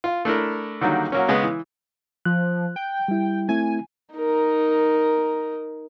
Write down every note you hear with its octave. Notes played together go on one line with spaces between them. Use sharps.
F4
A3 D4 E4 A#4
D3 D#3 F#3 G3 A#3
F#3 A#3 C#4
C#3 G#3 B3 B4
E3
F3 F#6
G5
G3 E4
A3 C4 E4 G#5
D#4 A#4